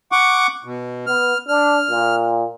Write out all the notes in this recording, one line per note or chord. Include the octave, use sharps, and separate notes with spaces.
F#5 C#6 D6
B2
B3 F6
D4 F6
A#2